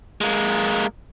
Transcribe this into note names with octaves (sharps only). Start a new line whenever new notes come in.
G#3 A#3